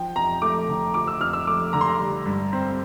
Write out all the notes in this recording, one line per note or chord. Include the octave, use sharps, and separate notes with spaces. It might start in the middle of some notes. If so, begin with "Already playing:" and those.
Already playing: F3 G5
F2 A#5
A3 D6
D3
F3 D6
E6
F2 F6
E6
A3 D6
D3 A#5
C6
A#5
G3
G2
C4